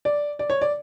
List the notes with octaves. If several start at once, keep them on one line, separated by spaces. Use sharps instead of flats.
D5
D5
C#5
D5